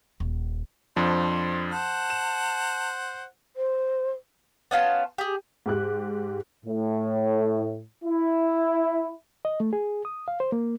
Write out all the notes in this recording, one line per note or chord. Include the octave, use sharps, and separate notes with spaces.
D#1
F2 F3 D4 C6
C5 F#5 A5
E7
C5
B3 C#4 F4 A5
G4 G#4
G#2 G4 F#6
A2
E4
D#5
A3
G#4
D#6
F5
C5
A#3